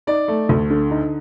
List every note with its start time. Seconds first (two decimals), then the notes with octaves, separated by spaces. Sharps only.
0.07 D#4 D5
0.28 A3
0.49 D2
0.70 D3
0.91 D#4